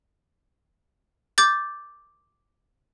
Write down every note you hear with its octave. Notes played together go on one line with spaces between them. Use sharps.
D6 G6 A6